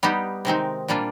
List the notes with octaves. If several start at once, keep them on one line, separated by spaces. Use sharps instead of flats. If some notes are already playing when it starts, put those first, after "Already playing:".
G3 B3 D#4 G4
C3 D#3 G#3 C4 D#4
A#2 G3 A#3 D4 F4